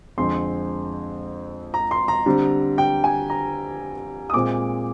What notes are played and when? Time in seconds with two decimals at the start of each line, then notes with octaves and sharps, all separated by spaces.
0.18 F2 D3 G#3 C4 C6
1.74 A#5
1.91 C6
2.08 A#5
2.26 D3 G3 C4
2.78 G5
3.04 G#5
3.30 A#5
4.30 D#6
4.34 A#2 G#3 C4 D6